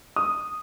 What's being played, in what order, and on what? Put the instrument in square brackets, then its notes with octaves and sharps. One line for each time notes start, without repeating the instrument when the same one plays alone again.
[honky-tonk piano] D#6